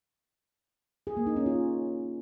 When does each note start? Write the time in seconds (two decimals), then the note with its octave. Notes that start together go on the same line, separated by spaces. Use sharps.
1.07 G#4
1.17 A#3
1.27 D#4
1.36 C#4
1.46 F4